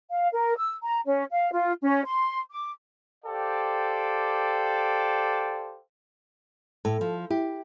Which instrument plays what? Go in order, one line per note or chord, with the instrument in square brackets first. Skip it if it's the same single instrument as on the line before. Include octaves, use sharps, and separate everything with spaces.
[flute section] F5
A#4
E6
A#5
C#4
F5
F4
C#4
C6
D6
[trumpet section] G4 A4 C5 D5 F5 G5
[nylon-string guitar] A2 [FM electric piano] A4
[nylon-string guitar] F3
[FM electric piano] E4 [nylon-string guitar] G4